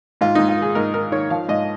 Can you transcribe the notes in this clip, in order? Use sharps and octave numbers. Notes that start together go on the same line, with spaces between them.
G#2 F4
G#2 D#4
F4
D#3
G#4
G#2 A#4
D#3 A#4
D#3 C#5
F3 F5
G#2 D#5